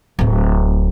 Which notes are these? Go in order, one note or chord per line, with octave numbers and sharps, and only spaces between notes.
D1 C4